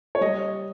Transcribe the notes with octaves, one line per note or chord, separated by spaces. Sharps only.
C#5
G3 D#5